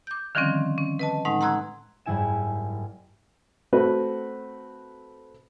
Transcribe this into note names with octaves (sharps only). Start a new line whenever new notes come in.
D6 G6
D3 D#3 F3 G3 C4 C#4
C#4
B4 D#5 A5
A2 G#3 D#4 F#5 C6
F#5 A#5 C6 E6 F#6 G#6
F#1 G#2 G3 E4 G#5 E7
A3 C4 F#4 B4